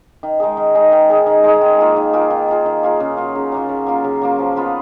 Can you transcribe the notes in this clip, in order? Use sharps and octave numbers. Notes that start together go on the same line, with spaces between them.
D#3
G#3 D#4 G#4
D#3
G#3 D#4 G#4
D#3
G#3 D#4 G#4
D#3
G#3 D#4 G#4
D#3
A#3 F4 G#4
D#3
A#3 F4 G#4
D#3
A#3 F4 G#4
D#3
A#3 F4 G#4
C#3
F#3 A#3 F4
C#3
F#3 A#3 F4
C#3
F#3 A#3 F4
C#3
F#3 A#3 F4
F3
B3 F4 B4